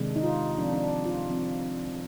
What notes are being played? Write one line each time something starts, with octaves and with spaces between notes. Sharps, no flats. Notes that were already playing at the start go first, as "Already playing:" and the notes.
Already playing: C3 D#3 G#3 D4
D#4
F4
F3 C4 D4
D4
F4
F3 C4